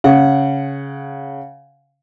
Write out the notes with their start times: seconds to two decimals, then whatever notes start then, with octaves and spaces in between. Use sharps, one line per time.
0.04 C#3 F#5